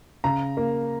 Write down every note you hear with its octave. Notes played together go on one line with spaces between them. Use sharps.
C#3 A#5
A#3